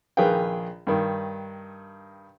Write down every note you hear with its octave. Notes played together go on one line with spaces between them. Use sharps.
A#1 D#3 G#4 B4 F5 G5
G2 D#3